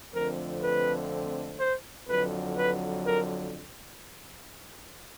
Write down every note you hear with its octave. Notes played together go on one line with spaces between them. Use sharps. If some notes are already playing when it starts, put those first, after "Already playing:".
F2 D3 F3 A3 C4 A#4
B4
C5
F2 D3 F#3 B4
B4
A#4